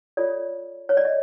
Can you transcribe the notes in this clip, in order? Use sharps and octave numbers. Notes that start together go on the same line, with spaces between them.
F4 A4 C#5 D5
C#5
D5
D#5